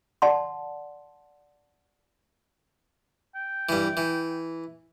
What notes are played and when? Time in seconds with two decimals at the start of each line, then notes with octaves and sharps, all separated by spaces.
0.22 D5 F#5 A5 C6
3.35 G5
3.69 G2 E3
3.97 E3